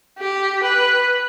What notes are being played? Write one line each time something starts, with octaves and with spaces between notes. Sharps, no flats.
G4
B4